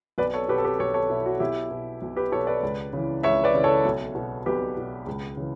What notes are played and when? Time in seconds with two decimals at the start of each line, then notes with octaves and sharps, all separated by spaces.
0.18 B1 B4 D5
0.34 A4 C#5
0.48 B2 G4 B4
0.58 A4
0.64 G4 B4
0.79 B1 A4 C#5
0.94 A4 C#5
1.10 B2 E4
1.26 F#4
1.40 B1 E4 G4
1.70 B2
2.02 B1
2.17 G4 B4
2.32 B2 A4 C#5
2.47 B4 D5
2.63 C#2
2.93 C#3 E3
3.23 C#2 C#5 E5
3.44 B4 D5
3.54 C#3 E3
3.64 A4 C#5
3.85 B1
4.15 B2
4.46 B1 G4 B4
4.77 B2
5.07 C#2
5.37 C#3 E3